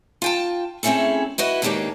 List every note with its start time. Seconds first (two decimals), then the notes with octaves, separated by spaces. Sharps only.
0.22 F4 G5 A5
0.83 A3 C4 C#4 E4 G#4 A4
1.38 E4 F#4 B4 D#5
1.62 D#2 G#2 A#3 D4 G4 C#5